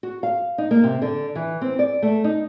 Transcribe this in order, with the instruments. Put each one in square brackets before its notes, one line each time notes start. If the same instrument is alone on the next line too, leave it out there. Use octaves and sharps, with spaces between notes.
[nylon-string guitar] F#4
F5
D#4
A#3
C3
D3
E3
C4
D5
A3
D#4